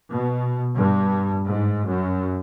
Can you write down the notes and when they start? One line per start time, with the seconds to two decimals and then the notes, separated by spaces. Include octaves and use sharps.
0.12 B2
0.77 G2
1.46 G#2
1.88 F#2